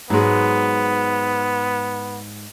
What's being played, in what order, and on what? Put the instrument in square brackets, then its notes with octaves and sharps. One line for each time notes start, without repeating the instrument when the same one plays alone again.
[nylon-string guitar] G#2 [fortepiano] F#3 G#3 [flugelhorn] B3